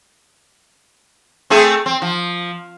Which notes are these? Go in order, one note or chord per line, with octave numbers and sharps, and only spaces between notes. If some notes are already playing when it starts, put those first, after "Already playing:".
A3 C4 G#4
C4
F3